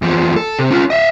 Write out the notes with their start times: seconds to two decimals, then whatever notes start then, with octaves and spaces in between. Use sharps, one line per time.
0.02 E2 F3
0.36 A4
0.59 C3
0.71 C#4 F4
0.90 D#5 E5